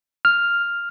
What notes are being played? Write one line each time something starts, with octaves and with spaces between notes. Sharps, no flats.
F6